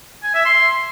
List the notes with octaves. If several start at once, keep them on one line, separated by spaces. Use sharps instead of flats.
G#5
E5
C6